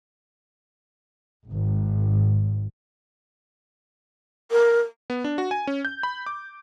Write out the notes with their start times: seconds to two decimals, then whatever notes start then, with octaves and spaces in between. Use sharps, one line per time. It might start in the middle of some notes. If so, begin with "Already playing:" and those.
1.50 G#1
4.51 A#4
5.10 B3
5.24 D4
5.38 F#4
5.51 G#5
5.67 C#4
5.85 G6
6.03 B5
6.26 D6